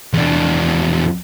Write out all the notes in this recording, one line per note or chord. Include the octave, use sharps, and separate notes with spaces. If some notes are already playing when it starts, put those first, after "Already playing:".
E2 D4